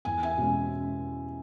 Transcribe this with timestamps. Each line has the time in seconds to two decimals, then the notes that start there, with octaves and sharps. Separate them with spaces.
0.05 E2 G#5
0.23 E5 G#5
0.38 B2 G#3 C#4